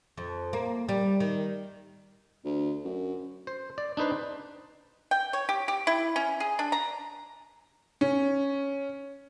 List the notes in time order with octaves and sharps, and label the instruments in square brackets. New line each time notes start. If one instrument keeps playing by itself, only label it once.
[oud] F2
A#3
G3
D#3
[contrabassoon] D2
F#2
[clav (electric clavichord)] C5
D5
D4 D#4 B4 C5
[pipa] G5
C#5
G4
G4
E4
C#4
G#4
D4
A#5
[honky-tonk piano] C#4